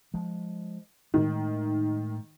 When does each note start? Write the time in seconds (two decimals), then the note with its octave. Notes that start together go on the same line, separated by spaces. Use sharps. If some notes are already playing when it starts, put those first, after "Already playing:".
0.14 F3 G#3
1.14 A2 D#3 G#3